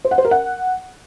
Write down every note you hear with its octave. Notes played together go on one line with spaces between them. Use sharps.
C5
F#5
C5
A#4
F#5